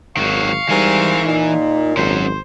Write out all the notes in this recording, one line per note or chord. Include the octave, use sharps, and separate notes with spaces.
G#1 D#3 F#3 F5 C#6
G#2 E3 G3 C4 A#4 G#5
A#2 D#4
G#1 F#3 C#4 C5